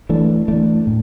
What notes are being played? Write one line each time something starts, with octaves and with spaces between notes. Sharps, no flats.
E3 A3 D4
E3 A3 D4
A2